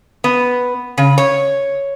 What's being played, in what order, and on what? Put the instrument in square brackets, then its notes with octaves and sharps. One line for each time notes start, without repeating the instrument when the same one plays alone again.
[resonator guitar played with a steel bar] B3
C#3
C#5